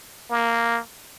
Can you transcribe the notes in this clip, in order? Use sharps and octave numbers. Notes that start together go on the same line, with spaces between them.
A#3